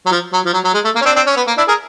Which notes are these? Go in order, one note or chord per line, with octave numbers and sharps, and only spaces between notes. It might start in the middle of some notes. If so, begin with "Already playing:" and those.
F#3
F3
F#3
F3
F#3
F#3
G#3
A3
A#3
C#4
C4 D4
C4 D4
C#4
B3
A#3
D4 E4
G#4 A#4